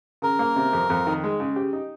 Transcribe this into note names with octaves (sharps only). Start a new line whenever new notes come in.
C#3 A#4
A#3
C3
F2
F2
D#3
G#3
C#3
G4
D#4